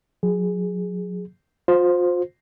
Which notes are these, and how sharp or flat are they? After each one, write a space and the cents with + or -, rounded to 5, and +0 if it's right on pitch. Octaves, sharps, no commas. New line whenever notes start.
F#3 -30 G#4 +0
F4 +35 C5 +0